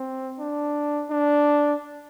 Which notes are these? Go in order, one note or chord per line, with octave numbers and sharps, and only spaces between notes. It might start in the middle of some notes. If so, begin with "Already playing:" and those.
Already playing: C4
D4
D4